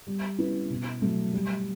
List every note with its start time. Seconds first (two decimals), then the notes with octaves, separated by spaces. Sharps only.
0.07 G3
0.38 C#4 E4 B4
0.70 B2
1.02 F#3 A3
1.33 G3